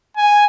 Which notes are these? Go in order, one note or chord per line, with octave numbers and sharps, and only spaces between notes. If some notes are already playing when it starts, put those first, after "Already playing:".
G#5